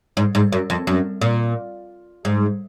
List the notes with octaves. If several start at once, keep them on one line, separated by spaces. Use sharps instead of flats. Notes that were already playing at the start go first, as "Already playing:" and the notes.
G#2
G#2
F#2
F2
F#2
A#2
G#2